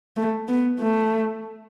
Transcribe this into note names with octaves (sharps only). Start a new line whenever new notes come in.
A3
B3
A3